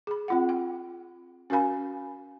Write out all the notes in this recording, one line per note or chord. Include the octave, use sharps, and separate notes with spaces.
G#4 B5
C4 F4 F#5
G5
C#4 F#4 A#4 F5 G#5 B5